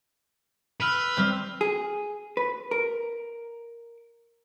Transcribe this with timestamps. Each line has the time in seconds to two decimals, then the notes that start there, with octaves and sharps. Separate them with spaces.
0.80 B4 E6 F6 F7
1.17 G3 C4 F6 G6
1.61 G#4
2.37 B4
2.71 A#4